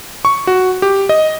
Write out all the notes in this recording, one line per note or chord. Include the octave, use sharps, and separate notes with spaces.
C#6
F#4
G4
D#5